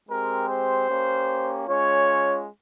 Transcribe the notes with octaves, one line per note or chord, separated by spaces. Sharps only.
G#3 C4 G4 A#4
C5
A#3 C#4 G4
G#3 C#4 F4 C#5